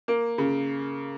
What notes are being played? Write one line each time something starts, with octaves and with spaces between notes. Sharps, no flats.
A#3
C#3